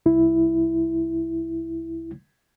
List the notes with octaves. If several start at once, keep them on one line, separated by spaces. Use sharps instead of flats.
C2 E4